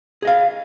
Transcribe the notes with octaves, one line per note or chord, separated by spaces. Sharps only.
G#4 D#5 F5